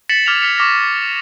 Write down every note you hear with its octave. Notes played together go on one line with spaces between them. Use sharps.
A6 B6 C#7 E7 F#7
D6 F6 G#6 A6 F7
F6 B6 C#7
C#6 D6 F6 A#6